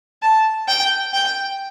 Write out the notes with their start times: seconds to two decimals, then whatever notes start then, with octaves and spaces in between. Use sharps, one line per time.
0.22 A5
0.68 G5
1.14 G5